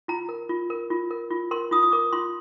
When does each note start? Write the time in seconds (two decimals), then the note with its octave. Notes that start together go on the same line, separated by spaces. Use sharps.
0.08 F4 A#5
0.29 A#4
0.49 F4
0.70 A#4
0.91 F4
1.11 A#4
1.31 F4
1.51 A#4 C6
1.71 F4 D#6
1.83 D#6
1.92 A#4 D6
2.12 F4 C6